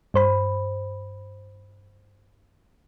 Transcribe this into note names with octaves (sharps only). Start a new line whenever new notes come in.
G2 C5 B5